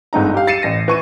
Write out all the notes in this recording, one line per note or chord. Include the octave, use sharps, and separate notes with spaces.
G1 G#2 D#4 A#5
G4 F5
A6 C7 C#7 D#7 E7
A1 A#6 D#7
E3 C#6 D#7